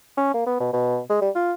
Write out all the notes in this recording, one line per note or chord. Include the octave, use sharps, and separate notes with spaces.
C#4
A#3
B3
B2
B2
G#3
G3
F4